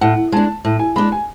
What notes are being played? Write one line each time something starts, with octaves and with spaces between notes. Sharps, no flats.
A2 F#5
G#3 D4 A5
A2
G#5
G#3 D4 B5
G#5